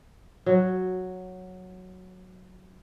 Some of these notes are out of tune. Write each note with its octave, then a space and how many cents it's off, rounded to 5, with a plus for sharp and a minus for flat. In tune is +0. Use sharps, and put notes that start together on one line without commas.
F#3 -5